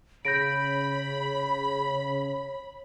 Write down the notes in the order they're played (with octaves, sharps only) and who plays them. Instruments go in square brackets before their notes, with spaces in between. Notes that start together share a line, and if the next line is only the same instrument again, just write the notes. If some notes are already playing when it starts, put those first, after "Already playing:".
[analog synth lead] C#3 [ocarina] C#5 [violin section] B5 [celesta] G6 A#6 D7